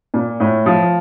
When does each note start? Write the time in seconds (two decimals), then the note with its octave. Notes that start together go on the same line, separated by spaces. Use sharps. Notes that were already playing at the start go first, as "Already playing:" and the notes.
0.14 A#2
0.40 A2
0.66 F3